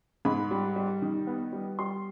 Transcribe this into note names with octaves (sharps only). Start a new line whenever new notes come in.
G#2 B5
G3
G3
D#3
B3
G3
G3 C6